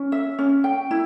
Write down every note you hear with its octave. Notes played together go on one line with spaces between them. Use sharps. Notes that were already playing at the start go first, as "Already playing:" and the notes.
Already playing: C#4
E5
C#4
G5
E4